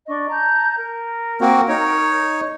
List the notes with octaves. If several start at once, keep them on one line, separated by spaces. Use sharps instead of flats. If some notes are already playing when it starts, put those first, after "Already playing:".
D4 D#5 C#6
A5 A#5 G6
A#4
A#3 C4 F#4
D#4 C#5